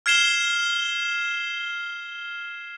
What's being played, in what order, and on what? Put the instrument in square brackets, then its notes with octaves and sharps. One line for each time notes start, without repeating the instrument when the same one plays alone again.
[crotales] F6 G#6 C7 E7 G7